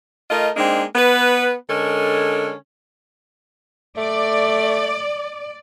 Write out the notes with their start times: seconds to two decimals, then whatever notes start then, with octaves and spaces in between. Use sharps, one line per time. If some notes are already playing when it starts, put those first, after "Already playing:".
0.30 A3 F4 A#4 D#5
0.56 G#3 A#3 C4 D4 D#4
0.95 B3 B4
1.69 D3 G#3 C#4 A4 A#4
3.98 A3 D5